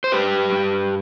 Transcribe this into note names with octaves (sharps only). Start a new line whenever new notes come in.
C5
G2 G4 B4
G2